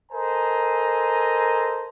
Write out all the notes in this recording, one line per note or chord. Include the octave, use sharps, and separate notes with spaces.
A4 A#4 C5 D#5 G#5 A#5